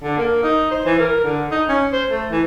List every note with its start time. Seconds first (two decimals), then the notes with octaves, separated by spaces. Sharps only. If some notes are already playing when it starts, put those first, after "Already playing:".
0.03 D3
0.18 A#3
0.43 D#4
0.71 C5
0.85 E3
0.99 A#4
1.24 D3
1.51 D#4
1.68 C#4
1.93 C5
2.11 A3
2.31 E3